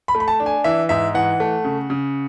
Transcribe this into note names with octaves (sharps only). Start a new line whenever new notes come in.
B5
A3
B5
A5
D4
G#5
E3 E5
G#2 E5
E3 F#5
A3
C#3
C#3